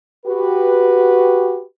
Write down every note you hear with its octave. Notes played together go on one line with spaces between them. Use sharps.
F#4 G4 B4